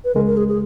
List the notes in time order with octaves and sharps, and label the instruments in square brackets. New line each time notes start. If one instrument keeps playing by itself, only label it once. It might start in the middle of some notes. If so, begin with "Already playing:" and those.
[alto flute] B4
[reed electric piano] C#2 C#3 G#3 [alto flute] A#4
[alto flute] A#4
G#4
G#4